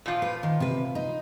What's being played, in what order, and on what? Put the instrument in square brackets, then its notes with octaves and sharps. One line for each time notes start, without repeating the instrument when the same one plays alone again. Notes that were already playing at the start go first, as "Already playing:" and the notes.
[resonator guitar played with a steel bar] A#2 F3 F4
[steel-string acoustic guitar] B4
D#3
C3 B4
D#4